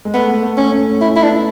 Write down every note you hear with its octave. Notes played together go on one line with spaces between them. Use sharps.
G#3
A3 B3
A3
C#4
A3
C#4 E4
E4
B3 D4